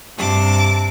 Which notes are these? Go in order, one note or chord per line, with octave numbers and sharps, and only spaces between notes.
G2 C3 A5 D6